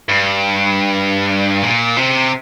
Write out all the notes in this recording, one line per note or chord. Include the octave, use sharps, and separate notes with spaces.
G2
A#2
C3